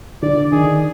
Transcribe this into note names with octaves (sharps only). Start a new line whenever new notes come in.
D3 D5
D#3 G#4